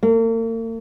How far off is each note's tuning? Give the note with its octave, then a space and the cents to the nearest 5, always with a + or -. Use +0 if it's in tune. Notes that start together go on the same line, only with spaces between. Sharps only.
A#3 -45